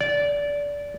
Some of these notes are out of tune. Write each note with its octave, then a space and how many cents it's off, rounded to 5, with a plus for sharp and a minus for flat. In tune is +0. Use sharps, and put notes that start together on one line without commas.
D5 -20